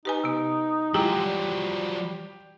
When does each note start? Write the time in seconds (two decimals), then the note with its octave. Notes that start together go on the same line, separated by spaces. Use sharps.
0.05 D#4 G4 B4 G#5
0.24 C3 B3
0.94 F3 F#3 G#3 E4 F4 G4 A#5
1.20 G3